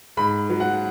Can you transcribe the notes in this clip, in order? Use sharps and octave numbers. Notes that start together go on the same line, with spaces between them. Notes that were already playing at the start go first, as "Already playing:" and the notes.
G#2 B5
F#3
F#5